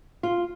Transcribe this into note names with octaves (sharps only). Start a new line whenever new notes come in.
F4